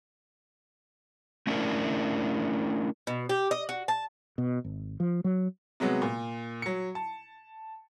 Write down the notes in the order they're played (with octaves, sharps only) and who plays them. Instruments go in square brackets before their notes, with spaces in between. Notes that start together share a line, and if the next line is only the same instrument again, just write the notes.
[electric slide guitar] A3 C#4 D4 E4 A#4
[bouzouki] B2
G4
D#5
F#4
A5
[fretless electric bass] B2
G#1
F3
F#3
[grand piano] C3 F#3 G#3 B3
A#2
F#3 C#7
A5